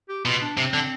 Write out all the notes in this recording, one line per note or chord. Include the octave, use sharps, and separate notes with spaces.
G4
B2 F4
D4
C3 C4
D3